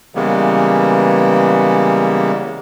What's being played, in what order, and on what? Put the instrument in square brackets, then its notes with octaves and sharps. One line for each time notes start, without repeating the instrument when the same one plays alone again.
[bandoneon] C#3 E3 G3 G#3 A#3 B3